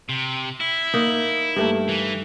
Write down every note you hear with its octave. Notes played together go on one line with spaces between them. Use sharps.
C3
E4
A#3 D#4
G2 A3 A#3
E3